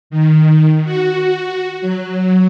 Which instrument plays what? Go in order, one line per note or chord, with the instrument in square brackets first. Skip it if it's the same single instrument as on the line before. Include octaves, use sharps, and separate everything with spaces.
[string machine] D#3
F#4
F#3